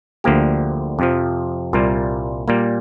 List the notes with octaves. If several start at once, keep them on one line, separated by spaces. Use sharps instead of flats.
D2 D3 F3 A#3 G4
F2 C3 F3
C2 A#2 G3 A#3 F4
A#2 G3 A#3